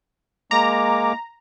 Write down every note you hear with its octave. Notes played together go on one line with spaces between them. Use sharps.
G#3 A#3 A#5 D6